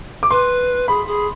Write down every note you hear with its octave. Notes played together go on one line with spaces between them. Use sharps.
D6
B4 C6
G#4 B5
G#4